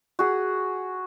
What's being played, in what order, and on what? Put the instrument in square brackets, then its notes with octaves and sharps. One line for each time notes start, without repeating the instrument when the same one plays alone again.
[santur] F#4 G#4